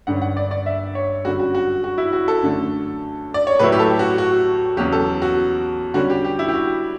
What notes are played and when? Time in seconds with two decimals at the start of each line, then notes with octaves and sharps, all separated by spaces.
0.07 G2 D3 G3 C#4 F#5
0.22 F#5
0.37 D5
0.51 D5
0.66 E5
0.95 C#5
1.25 F#2 D3 G3 F#4
1.40 F#4
1.55 F#4
1.84 F#4
1.98 E4
2.13 F#4
2.28 A4
2.42 F#2 D3 A3
3.34 D5
3.47 C#5
3.59 A2 F#3 A3 E4 B4
3.72 G4
3.79 A4
3.99 F#4
4.18 F#4
4.77 E2 C#3 F#3 G4
4.92 A4
5.22 F#4
5.94 D3 G3 C#4 F#4
6.10 G4
6.24 G4
6.39 E4
6.48 G4
6.54 F#4